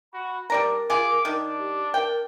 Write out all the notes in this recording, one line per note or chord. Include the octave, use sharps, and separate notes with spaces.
F#4 B5
G3 D4 A#4 D5 A#5
F4 G#4 D6
D#3 D4
G4
A#4 G5